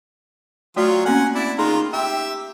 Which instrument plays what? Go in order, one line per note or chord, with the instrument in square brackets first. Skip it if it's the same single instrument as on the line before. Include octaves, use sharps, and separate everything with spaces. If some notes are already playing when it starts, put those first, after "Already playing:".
[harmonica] F#3 F4 [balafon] A3 F#4 D5
[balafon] A#3 C4 C#4 [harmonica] F#5 G#5
[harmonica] E4 D5
[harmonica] D#3 F4 A#5 [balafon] D#4 G#4 C6
[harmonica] G4 E5 [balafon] G5